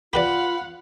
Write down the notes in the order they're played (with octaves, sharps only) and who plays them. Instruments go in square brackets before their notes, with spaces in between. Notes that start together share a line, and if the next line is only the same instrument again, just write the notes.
[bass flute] F4 [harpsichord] G4 B4 D5 [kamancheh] F5 F#5 [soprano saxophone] B5